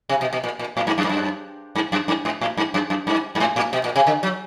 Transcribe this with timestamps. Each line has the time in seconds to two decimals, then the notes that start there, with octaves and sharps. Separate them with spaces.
0.09 C3
0.21 B2
0.33 B2
0.44 A#2
0.59 A#2
0.77 A2
0.87 G2
0.98 F#2
1.04 G2
1.09 F#2
1.75 G2
1.92 F#2
2.08 G2
2.25 G#2
2.41 A2
2.57 G2
2.74 F#2
2.90 F#2
3.07 G2
3.35 G2
3.40 G#2
3.56 A2
3.73 B2
3.84 A#2
3.96 C3
4.07 D3
4.23 F#3